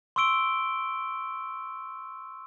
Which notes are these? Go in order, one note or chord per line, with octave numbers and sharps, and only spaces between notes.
C6 C#6 E6 D7 G7